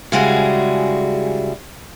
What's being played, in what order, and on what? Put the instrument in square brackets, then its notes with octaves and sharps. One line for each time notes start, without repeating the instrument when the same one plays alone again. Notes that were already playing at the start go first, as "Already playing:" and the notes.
[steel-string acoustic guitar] C#3 G3 G#3 E4 F#4 G#4